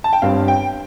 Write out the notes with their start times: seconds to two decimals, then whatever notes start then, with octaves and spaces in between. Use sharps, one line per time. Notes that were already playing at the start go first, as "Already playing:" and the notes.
0.04 A5
0.13 G5
0.22 G1 G2 G3 C4 F5
0.48 G5